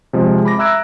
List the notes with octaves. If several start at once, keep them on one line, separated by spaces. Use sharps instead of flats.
C3 F3 G#3 D#5
B5 D6 A#6
E5 A#5 E6 F#6 G#6 D7